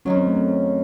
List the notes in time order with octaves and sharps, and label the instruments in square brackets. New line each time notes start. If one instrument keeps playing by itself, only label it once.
[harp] F#2 D#3 F#3 [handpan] C#4
[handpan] C4
A3
C4